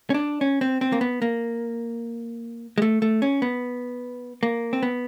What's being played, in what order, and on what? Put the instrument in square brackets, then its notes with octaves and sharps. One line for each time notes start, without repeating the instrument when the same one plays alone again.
[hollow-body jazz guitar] C#4
D4
C#4
C4
C4
A#3
B3
A#3
G#3
A3
A3
C#4
B3
A#3
C4
B3